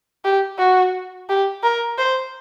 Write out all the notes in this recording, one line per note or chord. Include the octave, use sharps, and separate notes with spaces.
G4
F#4
G4
A#4
C5